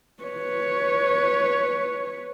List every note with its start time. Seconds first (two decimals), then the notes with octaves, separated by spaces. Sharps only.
0.23 B4 C#5